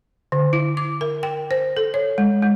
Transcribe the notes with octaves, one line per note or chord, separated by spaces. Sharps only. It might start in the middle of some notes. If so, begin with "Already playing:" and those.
D3
E4
D6
A#4
G5
C5
A4
C#5
G#3
G#3